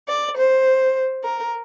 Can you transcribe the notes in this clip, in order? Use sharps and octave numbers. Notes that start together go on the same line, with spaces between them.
D5
C5
A#4